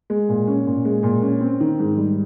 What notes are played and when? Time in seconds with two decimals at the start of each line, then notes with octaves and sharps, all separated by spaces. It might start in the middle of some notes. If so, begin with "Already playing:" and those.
0.10 G#3
0.29 A#2
0.47 C#4
0.67 A#2
0.85 G#3
1.03 A#2
1.22 C#4
1.41 C4
1.60 D#3
1.79 G#2
1.97 G3